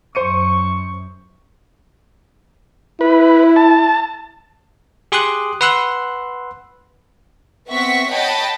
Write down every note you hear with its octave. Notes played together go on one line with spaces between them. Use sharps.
F#2 C5 C#6 C#7 D#7
E4 B4
A5
G4 G#4 C6 D6 D#6 F#6
B4 F#5 C6 E6 F#6
B3 C4 E5 F#5 C#6 B6
C#5 D#5 F#5 G5 A5 B5